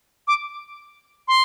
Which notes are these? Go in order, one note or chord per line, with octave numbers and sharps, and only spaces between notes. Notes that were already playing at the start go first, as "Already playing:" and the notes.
D6
C6